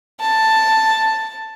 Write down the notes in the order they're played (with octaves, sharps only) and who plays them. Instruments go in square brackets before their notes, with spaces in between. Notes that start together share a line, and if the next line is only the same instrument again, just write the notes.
[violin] A5